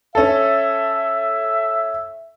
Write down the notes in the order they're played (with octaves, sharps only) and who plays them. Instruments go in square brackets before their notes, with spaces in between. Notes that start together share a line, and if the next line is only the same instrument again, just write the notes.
[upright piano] C#4 A4 [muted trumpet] E5